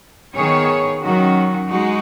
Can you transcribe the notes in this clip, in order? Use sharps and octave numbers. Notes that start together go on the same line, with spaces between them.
D#3 B3 G#4 C#5
D#3 F#3 C#4 F#4
G#3 D#4 F#4